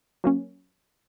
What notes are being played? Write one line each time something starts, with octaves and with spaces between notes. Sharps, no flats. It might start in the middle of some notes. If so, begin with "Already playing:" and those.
F#3 A#3 C#4